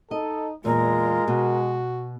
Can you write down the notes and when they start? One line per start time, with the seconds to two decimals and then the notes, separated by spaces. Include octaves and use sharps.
0.11 D#4 A4 D#5
0.65 E2 A#2 G#3 F4 A#4
1.28 B2 F#4